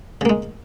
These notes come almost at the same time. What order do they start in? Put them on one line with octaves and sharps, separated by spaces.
C#3 A#3 G#3